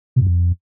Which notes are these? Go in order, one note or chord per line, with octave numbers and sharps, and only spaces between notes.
B2
F#2
F2